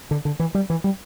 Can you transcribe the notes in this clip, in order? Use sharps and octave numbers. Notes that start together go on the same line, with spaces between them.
D3
D3
E3
G3
E3
G3